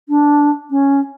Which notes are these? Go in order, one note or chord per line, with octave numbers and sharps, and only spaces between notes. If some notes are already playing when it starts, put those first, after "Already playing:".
D4
C#4